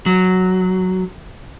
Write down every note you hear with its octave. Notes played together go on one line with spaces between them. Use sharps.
F#3